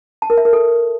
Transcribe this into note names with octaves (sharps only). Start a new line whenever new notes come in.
A5
A#4
E5
A#4
A4